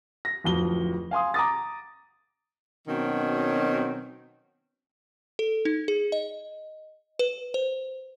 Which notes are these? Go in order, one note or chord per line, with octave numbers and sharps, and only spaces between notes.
A#6
D1 F2 G7
F5 G#5 C6 D#6
A#5 D6 D#6 A6
B2 D#3 F#3 C4 C#4
A4
D#4
G#4
D#5
B4
C5